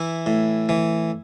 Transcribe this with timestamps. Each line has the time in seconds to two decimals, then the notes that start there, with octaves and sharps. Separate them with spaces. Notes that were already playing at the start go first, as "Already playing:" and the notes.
Already playing: E3 E4
0.26 A2
0.69 E3